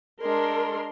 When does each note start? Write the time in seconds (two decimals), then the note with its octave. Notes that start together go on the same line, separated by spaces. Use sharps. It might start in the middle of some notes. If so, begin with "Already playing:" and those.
0.22 G#3 D4 A#4 C6